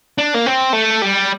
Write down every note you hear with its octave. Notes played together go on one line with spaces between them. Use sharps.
D4
A#3
C4
A3
G3